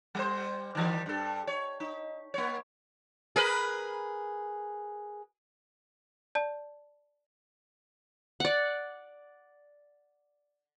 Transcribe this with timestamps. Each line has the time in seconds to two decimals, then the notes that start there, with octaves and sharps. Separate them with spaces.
0.15 G3 C5
0.75 D#3 E3 G3
1.06 G2 A4
1.47 C#5
1.80 D#4
2.34 A#3 C#5
3.36 G#4 A#4 B4
6.35 D5 A5
8.40 D5 F#5